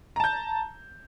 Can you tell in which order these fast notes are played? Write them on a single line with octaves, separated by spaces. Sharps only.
A#5 A5 G6